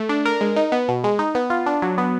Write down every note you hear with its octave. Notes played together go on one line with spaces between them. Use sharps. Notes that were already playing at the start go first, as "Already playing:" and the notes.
Already playing: A3
D4
A#4
G#3
D#4
B3
B2
G#3
D#4
B3
F4
D4
F#3
B3